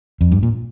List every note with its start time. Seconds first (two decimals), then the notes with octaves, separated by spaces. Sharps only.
0.21 F2
0.32 G2
0.43 A#2